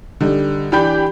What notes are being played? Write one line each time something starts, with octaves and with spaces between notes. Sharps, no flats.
D3 G3 D#4
E3 D4 G4 B5 G6